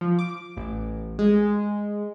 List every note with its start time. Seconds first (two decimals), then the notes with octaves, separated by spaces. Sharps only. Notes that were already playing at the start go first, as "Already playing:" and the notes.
0.01 F3
0.19 D6
0.57 A1
1.19 G#3